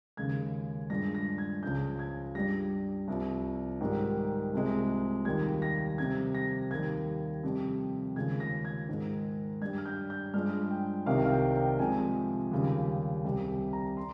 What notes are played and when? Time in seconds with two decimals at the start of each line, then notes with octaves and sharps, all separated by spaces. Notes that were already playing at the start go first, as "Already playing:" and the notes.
0.17 D#2 C#3 G#3 G#6
0.90 G2 F3 G#3 A#6
1.15 A#6
1.38 G#6
1.63 C#2 C#3 F3 G#3 G6
1.99 G#6
2.35 G2 G3 A#6
3.08 C2 C3 F3
3.81 G#2 D#3 G3
4.53 C2 C3 F3 G#3
5.25 D#2 D#3 G3 G#6
5.62 A#6
5.98 F2 C3 G3 G#6
6.35 A#6
6.71 D#2 D#3 G3 G#6
7.43 F2 C3 G3
8.16 D#2 C#3 F3 G#3 G#6
8.40 A#6
8.65 G#6
8.89 G#2 D#3 G#3
9.61 G2 G3 G#6
9.78 F6
9.86 G6
10.10 G6
10.34 G2 F3 G#3 F6
10.70 G5
11.06 C2 C3 D#3 G3 F5
11.25 F5
11.31 G5
11.55 G5
11.79 F2 C3 F3 G#3 G#5
12.52 D#2 C#3 G3
13.24 C2 C3 G3
13.73 A#5
13.97 C6